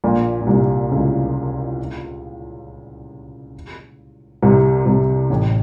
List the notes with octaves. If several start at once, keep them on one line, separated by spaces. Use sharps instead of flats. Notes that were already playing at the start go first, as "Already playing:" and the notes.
A#1 A#2
A#2
C2 C3
C#2 C#3
C2 C3
C2 C3
A1 A2